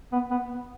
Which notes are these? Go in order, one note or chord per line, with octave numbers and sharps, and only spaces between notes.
B3
B3